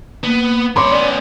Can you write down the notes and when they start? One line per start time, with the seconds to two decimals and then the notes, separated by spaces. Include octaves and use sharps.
0.24 A#3 B3
0.76 G2 C#5 B5 C6 D6
0.91 B3 C#4 D5